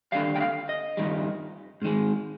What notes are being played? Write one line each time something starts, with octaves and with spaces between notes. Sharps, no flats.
D#2 D3 G3 F5
G5
F5
D#5
G2 D#3 G3
G#2 D#3 G#3